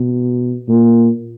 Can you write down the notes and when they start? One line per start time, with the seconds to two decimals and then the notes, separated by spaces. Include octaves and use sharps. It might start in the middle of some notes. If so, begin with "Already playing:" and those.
Already playing: B2
0.69 A#2